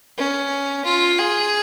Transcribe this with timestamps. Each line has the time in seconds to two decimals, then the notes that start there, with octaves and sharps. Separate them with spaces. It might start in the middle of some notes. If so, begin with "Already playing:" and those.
0.18 C#4
0.85 F4
1.18 G#4